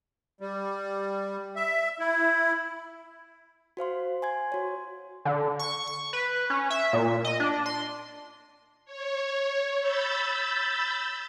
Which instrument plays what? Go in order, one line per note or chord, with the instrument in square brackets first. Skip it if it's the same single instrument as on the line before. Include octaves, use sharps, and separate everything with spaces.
[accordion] G3
E5
E4
[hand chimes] F#4 C5 F5 C6
G#5 C6 G#6
F#4 C#5
[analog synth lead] D3
C#6
C#6
B4
C#4
E5
A#2
D#5
D4
C6
[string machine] C#5
B5 E6 G6 A6